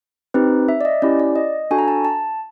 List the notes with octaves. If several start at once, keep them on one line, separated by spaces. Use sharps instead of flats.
C4 D#4 G4 B4
E5
D5
D#5
C#4 E4 G4 D5
D5
D#5
D4 F#4 A4 G#5
A#5
A5
A5